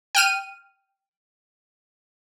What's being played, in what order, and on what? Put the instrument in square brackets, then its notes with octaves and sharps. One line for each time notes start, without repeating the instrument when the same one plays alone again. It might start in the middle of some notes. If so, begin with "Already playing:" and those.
[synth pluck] G5 F6 D#7